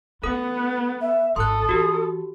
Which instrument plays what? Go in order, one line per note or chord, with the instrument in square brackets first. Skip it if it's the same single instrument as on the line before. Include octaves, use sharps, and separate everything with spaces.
[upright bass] A3 [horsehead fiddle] B3 [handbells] A4 D#6
[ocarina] E5
[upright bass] G#1 [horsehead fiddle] A4 [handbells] C6 F#6 [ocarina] D#6
[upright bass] E3 [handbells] F#4 G4